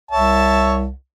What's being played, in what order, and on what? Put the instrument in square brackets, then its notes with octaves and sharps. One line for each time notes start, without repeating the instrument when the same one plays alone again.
[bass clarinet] C2 [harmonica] C#5 E5 A5